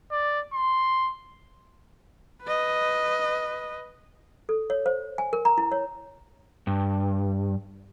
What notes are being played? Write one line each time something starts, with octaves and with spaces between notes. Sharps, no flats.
D5
C6
B4 D#5
A4
C#5
C5
G#5
A#4
A#5
E4
C#5
G2